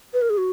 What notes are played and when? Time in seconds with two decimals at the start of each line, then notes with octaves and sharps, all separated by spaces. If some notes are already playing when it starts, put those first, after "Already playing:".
0.14 B4
0.22 A#4
0.30 G#4
0.38 F#4